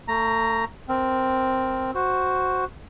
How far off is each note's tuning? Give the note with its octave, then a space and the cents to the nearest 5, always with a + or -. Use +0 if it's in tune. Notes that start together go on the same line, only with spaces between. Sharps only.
A3 +30 A#5 +0
C4 +0 A#4 +0
F#4 +0 C5 +0